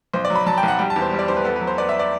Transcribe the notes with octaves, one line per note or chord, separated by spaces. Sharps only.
B1 C5
D5
F#3
B5
F#3 A5
G5
B1
F#5
G3 G5
A5
E2
C5
G3
D5
E2 C5
B4
B3 A4
B4
F#3
C5
B3 D5
E5
D5